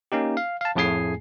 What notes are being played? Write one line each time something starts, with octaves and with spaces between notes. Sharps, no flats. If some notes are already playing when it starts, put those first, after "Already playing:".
A#3 C#4 D#4 G4
F5
F5 A5
F2 A2 A3 G#4 G#5 C7